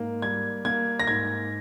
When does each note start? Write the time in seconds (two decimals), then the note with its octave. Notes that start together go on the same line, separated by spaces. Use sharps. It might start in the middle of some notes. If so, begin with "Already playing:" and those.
Already playing: G#2 A#3
0.22 G3 G#6
0.65 A#3 G#6
1.00 A#6
1.07 G#2 G#6